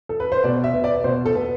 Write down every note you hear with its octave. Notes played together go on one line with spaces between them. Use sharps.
A4
B4
C5
B2 D5
E5
B3
D5
B2 C5
A4
B3